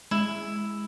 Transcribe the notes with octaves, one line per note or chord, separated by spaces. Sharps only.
G#3 E4